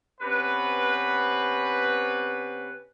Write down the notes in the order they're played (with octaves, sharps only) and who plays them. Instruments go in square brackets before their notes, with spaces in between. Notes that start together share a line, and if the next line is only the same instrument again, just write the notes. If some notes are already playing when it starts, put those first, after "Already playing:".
[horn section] C3 B3 C#4 B4